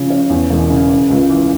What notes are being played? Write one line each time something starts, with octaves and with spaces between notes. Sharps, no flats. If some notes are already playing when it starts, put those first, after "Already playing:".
Already playing: C#3 F3 C#4
C#4
E2
E1
C#3
C#3
C#2
E3